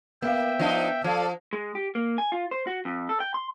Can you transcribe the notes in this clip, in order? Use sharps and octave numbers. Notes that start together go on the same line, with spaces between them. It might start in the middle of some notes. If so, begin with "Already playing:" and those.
A#3 B3 E5 F5 G5
F3 D4 D#4
F3 A4 D5 F5
G#3
G4
A#3
G#5
F4
C5
F#4
F2
A4
G5
C6